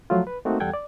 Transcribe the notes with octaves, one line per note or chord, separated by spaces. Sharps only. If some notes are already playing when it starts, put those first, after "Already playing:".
F3 F#3 A3 F4
B4
A3 A#3 C4 D#4 F#4
E2 G3 A4 F#5 G5 G#6
D5